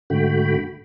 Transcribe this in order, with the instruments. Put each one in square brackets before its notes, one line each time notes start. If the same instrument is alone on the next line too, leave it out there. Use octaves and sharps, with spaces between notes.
[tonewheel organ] G#2 D3 A3 F#4 G5 B5